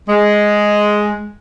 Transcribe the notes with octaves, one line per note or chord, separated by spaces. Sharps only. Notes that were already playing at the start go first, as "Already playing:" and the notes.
G#3